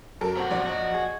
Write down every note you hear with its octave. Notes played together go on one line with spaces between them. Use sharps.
F#2 A4 A#4
C3 F#4 C5 F#5
A#1 F#2 D5
F#4 D#5 A5
G#4 C#6 G#6